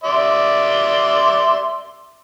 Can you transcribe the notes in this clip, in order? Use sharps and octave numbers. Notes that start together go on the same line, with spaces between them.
D5 E5 C6